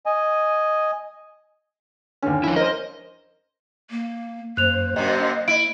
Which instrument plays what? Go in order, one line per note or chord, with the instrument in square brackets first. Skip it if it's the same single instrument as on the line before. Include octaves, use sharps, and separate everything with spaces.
[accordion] D#5 G#5
[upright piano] D#2 D3 [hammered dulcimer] C#4
[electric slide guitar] F3 E4
[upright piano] A#4 C5 [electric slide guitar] D#5
[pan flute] A#3
[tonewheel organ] F#2 C5 [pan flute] A#3 [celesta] F#6 F7
[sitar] F#2 C3 [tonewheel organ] D#5
[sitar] E4 [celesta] D7